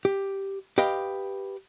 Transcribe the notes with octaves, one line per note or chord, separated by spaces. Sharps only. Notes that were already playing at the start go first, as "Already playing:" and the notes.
G4
G4 B4 D#5 F5 G5